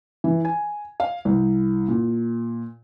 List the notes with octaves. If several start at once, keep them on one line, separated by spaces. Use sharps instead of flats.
E3
G#5
F5
C2
A#2